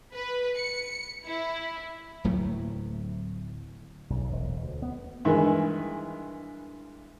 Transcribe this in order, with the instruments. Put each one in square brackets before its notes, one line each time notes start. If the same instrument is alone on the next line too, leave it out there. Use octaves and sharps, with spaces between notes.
[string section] B4
C#7
E4
[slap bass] D1 A2 F#3 A3
B1
E1
D2
B3
[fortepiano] G2 D#3 E3 G#3